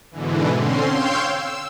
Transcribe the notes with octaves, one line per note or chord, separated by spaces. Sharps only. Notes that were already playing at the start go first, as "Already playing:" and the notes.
G#2 B2 D3 E3
D3 C4 C#4 C6
C#5 F5 G5 C6 E6 G6
E6